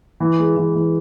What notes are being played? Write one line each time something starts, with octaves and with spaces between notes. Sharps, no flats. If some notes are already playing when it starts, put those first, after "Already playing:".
E3
G#3
E3
E3